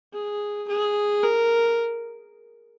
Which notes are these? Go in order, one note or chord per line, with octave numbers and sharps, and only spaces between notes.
G#4
G#4
A#4